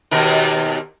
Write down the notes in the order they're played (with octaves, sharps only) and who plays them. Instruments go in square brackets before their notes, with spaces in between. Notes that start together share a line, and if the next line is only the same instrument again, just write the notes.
[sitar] D#2 B2 A#4